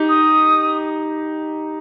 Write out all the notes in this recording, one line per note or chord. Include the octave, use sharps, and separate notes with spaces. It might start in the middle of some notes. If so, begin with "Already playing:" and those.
Already playing: D#4 G4
D#6